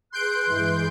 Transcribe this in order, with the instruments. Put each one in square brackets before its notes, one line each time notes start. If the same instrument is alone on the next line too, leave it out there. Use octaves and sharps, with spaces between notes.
[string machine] G#4 B4 [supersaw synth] C6 G6 D7 [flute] F#6
[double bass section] G2 E3 G#3